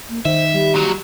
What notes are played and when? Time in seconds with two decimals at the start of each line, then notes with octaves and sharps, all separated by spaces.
0.09 A#3
0.25 D#3 C5 E5
0.53 G3
0.74 A#2 F#3